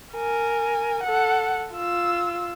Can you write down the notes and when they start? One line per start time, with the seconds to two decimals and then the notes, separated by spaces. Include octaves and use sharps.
0.14 A#4 G#5
1.04 A4 F#5
1.74 F4 E6